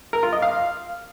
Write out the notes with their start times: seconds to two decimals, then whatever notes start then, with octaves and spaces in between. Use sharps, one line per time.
0.13 A#4
0.23 F4
0.33 D#5
0.42 F5